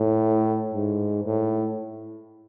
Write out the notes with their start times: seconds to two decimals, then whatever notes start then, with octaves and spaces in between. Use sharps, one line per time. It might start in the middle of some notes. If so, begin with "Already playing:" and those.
Already playing: A2
0.74 G#2
1.24 A2